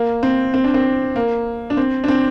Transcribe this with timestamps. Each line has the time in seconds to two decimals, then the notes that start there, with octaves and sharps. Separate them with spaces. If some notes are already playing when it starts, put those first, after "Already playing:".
Already playing: A#3
0.23 C4
0.54 C4
0.64 D4
0.74 C4
1.16 A#3
1.70 D4
1.77 C4
2.04 D4
2.08 C4